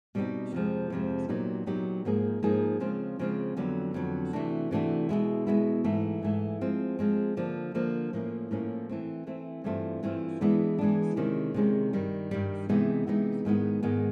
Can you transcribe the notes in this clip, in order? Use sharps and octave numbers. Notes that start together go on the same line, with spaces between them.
B2 G3 C4 D#4 G4
F2 C3 F3 G#3
F2 C3 F3 G#3
A#2 F#3 B3 D#4 G4
A#2 F#3 B3 D#4 G4
G#2 F3 A#3 D#4 G#4
G#2 F3 A#3 D#4 G#4
C#3 F3 G#3 C4 F4
C#3 F3 G#3 C4 F4
F2 D3 F#3 B3
F2 D3 F#3 B3
C3 E3 A3 D4 F#4
C3 E3 A3 D4 F#4
B2 G#3 B3 E4
B2 G#3 B3 E4
G#2 E3 A3
G#2 E3 A3
F3 G#3 C4
F3 G#3 C4
D3 F3 A#3 D4
D3 F3 A#3 D4
A2 F3 A#3 C#4
A2 F3 A#3 C#4
E3 A3 C4
E3 A3 C4
G2 E3 A3 C4 F4
G2 E3 A3 C4 F4
E3 G#3 B3 D4
E3 G#3 B3 D4
C3 D#3 G#3 C#4
C3 D#3 G#3 C#4
G2 D#3 G3
G2 D#3 G3
C3 E3 G#3 B3 D#4
C3 E3 G#3 B3 D#4
G#2 D#3 G#3 B3
G#2 D#3 G#3 B3